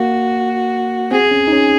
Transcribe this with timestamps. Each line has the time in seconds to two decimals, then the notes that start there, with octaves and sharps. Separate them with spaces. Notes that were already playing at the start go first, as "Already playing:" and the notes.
Already playing: A#3 F#4
1.11 C4 G#4
1.31 C#4
1.48 D#4
1.52 C#4